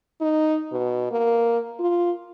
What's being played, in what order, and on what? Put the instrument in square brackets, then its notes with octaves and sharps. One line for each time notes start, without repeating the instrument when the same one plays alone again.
[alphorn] D#4
B2
A#3
F4